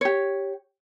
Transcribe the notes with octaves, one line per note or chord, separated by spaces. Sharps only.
G4 C#5